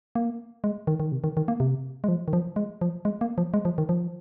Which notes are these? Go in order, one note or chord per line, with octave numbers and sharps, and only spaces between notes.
A#3
G#3
D#3
D#3
C3
D#3
D#3
A#3
C3
G#3
F3
D#3
F3
G#3
F3
G#3
A#3
F3
G#3
F3
D#3
F3